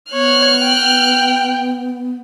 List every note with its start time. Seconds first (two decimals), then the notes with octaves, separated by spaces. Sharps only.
0.13 B3 C#5 F6 F#6
0.63 G5